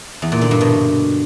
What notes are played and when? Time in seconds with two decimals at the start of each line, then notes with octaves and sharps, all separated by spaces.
0.22 E2
0.32 A#2
0.41 D3
0.51 G2
0.61 B2